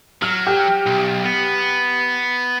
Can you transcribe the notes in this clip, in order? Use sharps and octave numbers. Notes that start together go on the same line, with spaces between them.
F#3 F6
G4
B1
B3